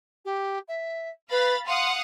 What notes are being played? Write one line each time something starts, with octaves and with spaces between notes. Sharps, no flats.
G4
E5
B4 F5 B5 A6
F5 F#5 C6 D#6